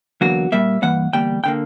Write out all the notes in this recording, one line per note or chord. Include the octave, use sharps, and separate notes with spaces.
E2 D3 F#3 A#3 F#4
A#2 G3 A#3 E5
G2 E3 A#3 F#5
E2 D3 G3 A#3 G5
D3 A#3 G5